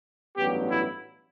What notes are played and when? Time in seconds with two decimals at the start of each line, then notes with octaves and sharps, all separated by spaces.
0.36 A1 G2 F#3 B3 G4
0.71 E4